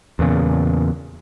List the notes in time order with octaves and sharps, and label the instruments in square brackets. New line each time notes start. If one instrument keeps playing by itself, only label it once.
[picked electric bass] E2 A#2 C#3